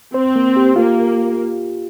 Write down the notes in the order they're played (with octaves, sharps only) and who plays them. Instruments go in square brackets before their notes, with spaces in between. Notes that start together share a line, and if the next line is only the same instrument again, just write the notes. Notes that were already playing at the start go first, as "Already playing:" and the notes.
[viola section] C4 [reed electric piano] C5
[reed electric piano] A#3
G4
[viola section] A#3 [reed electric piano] F4